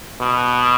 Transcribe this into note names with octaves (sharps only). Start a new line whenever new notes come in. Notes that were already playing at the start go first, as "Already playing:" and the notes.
B2